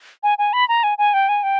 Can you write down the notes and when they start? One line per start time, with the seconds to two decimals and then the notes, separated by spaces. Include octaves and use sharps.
0.23 G#5
0.38 G#5
0.53 B5
0.69 A#5
0.83 G#5
0.98 G#5
1.14 G5
1.29 G#5
1.43 G5